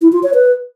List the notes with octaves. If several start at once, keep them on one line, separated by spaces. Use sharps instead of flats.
E4
F4
C#5
B4